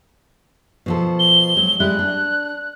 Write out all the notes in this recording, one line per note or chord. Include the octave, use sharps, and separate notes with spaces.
B2 F3 A4
G7
F#3 G#3
G3 G#3 E4 F#6
D4